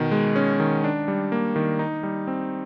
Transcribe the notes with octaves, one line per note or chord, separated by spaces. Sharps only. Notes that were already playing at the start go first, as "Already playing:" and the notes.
Already playing: B2 D#3
G#3
C#4
D#3
D4
G3
A#3
D#3
D#4
G3
C4